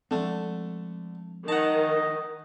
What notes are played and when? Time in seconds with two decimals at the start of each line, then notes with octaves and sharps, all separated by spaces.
0.11 D3 F3 G#3 A3 C4
1.48 D#3 D#5 F#5 A5